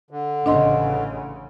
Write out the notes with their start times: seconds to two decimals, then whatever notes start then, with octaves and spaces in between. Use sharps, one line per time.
0.11 D3
0.46 A1 C#3 D4 D#5 C6